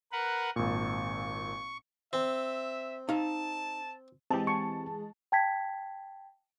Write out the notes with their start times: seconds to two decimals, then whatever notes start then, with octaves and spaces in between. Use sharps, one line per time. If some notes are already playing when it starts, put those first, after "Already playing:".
0.12 A#4 B4 F#5
0.56 G#1 A#2 C#6
2.13 C4 E5
3.09 D#4 F5 A5
4.31 E3 G#3 C4 G4 G#4 A5
4.47 C#6
5.32 G5 A5 G#6 B6